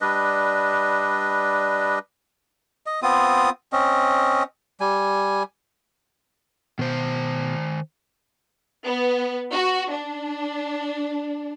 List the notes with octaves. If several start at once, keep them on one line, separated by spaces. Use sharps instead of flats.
G3 D4 B4 D#5
D#5
B3 C4 F4 D#6
C4 C#4 D#5
G3 G#5
B2 D#3 C5
B3
F#4
D4